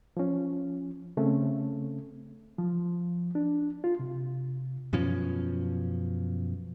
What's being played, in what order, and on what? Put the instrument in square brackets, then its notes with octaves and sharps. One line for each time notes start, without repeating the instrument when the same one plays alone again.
[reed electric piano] F3 C#4
C#3 A3 C4 C#4
F3
D4
F4
C3
[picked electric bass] F#2 B2 F3 C#4